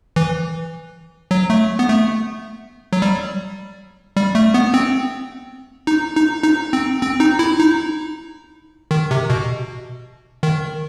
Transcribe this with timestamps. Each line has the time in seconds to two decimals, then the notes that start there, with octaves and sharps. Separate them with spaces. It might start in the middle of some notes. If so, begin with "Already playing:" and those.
0.16 E3
1.31 F#3
1.50 A3
1.79 B3
1.88 A3
2.93 F#3
3.02 G3
4.16 G3
4.35 A3
4.54 B3
4.74 C4
5.87 D#4
6.16 D#4
6.44 D#4
6.73 C4
7.01 C4
7.20 D#4
7.39 E4
7.59 D#4
8.91 D#3
9.11 C3
9.30 B2
10.43 D#3